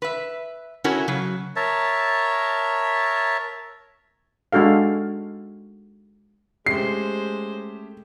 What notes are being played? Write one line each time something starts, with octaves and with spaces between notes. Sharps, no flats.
B4 E5
C#4 E4 F#4 A4 A#4 C#5
C#3 F#3
A#4 C#5 E5 A5
G#3 D4 F#4 A4 F5
G#3 A3 C#4 G4 C5 C7